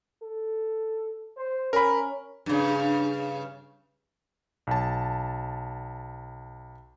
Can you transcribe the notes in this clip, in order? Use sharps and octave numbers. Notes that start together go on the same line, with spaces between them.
A4
C5
C#4 A#4 B5
G2 C#3
B1 A5